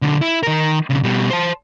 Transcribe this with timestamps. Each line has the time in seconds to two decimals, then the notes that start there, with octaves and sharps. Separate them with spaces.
0.02 B1 D3
0.21 E4
0.43 D#3 A#4
0.90 B1 C#3
1.04 B2 G3
1.30 C5 A5